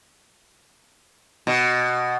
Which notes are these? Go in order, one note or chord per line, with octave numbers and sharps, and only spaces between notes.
B2